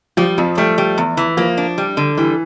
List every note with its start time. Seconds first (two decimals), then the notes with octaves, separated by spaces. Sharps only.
0.17 F3 G3
0.38 F2 F3
0.57 G3 A3
0.78 G3
0.98 E2
1.17 E3
1.37 F3 A#3
1.57 D4
1.78 G3
1.97 D3
2.17 E3 G3